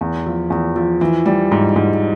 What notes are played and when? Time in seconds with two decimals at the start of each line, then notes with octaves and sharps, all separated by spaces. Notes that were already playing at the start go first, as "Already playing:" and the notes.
0.01 E2
0.26 F3
0.50 E2
0.76 F3
1.01 E3
1.26 G3
1.51 G#2
1.76 G#2